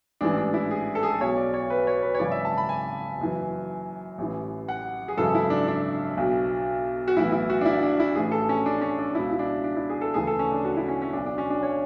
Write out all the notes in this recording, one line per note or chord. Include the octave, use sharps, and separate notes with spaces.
A1 G#2 E3 D4
D4
E4
G#4
A4
G#4
A4
B1 B2 C#5
D5
C#5
B4
C#5
B4
C#5
G#1 F#2 C#3 E3 D5
E5
A5
B5
G#5
F#1 F#2 E3
A1 A2 E3
F#5
G#4
G#1 F#2 C#3 E3 A4
E4
D4
D4
B1 B2
F#4
B1 A2 E3 E4
E4
F#4
D4
E4
D4
E4
A1 A2 E3 G#4
A4
C#4
D4
C#4
D4
C#2 B2 E4
E4
D4
D4
E4
G#4
A4
D2 C#3 E3 G#4
A4
C#4
D4
F#4
E4
C#4
C#4
B1 B2 D4
D4
C#4
D4
C#5